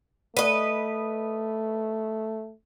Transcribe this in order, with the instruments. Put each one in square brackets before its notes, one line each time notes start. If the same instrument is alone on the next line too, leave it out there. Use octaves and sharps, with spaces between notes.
[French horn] A3 [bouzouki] B4 D#5